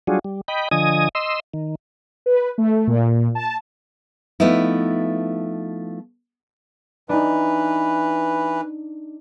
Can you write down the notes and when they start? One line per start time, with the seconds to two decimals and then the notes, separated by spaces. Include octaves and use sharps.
0.07 F#3 G3 D4 F4 F#4 G#4
0.24 G3
0.48 D#5 G5 B5
0.71 D3 F3 D#5 G#5 D#6
1.15 D#5 C6 E6
1.54 D#3
2.26 B4
2.58 A3
2.87 A#2
3.35 A5
4.40 F3 A3 B3 D#4 E4
7.09 E3 D4 D#4 B4